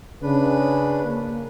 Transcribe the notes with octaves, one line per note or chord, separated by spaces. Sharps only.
C#3 D4 B4
A#3